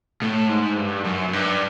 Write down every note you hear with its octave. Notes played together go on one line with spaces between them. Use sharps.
A2
G#2
G2
F#2
F#2
G2